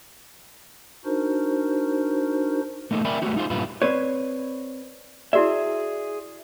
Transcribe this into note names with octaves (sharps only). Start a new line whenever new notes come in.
D4 D#4 F#4 A#4 C5
A3 A#3 D#4 F#4 G#4
A#4 D5 E5 G5 G#5 B5
G#3 A3 B3 C4 F#4 G4
D#4 F4 G#4 C5
G2 A#2 E4 F4 G4 B4
C4 B4 C#5 D5
E4 F#4 G#4 D5 E5